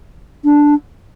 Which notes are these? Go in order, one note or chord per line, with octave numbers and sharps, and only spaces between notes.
D4